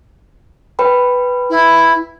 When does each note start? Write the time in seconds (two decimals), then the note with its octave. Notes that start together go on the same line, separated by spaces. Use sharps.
0.79 B4 G5 B5
1.50 E4